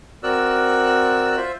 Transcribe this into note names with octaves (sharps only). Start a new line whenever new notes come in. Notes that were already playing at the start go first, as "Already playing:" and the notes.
C4 F#4 A#4 D5 E6 F#6
F4 C5 E5